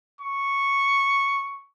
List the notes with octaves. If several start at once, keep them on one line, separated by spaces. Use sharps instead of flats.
C#6